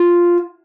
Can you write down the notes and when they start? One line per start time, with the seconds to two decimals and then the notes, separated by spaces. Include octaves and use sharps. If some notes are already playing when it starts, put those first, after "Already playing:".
Already playing: F4